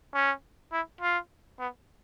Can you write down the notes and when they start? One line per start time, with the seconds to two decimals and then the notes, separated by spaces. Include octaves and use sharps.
0.14 C#4
0.72 E4
1.01 F4
1.59 B3